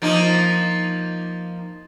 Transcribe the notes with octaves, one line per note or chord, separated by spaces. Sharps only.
F3 A#3 D#4